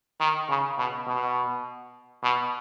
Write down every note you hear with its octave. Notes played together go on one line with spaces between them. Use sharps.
D#3
C#3
B2
B2
B2